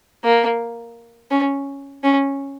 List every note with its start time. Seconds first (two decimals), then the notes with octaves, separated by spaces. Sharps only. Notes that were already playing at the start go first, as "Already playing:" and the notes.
0.24 A#3
1.31 C#4
2.04 C#4